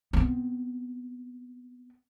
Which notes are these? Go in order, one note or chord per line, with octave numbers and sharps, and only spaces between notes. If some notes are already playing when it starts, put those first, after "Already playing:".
B3 C4